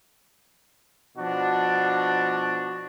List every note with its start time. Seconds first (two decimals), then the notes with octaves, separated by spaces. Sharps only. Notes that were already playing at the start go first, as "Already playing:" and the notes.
1.18 B2 F3 D4 F#4